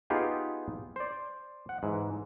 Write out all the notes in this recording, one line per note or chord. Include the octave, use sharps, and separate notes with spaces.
B3 D#4 F4 G4 G#4
C5 D5
F#5
G#2 E3